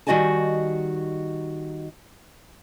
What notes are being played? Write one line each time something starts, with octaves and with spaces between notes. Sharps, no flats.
D#3 G3 F#4 D#5 G#5 A5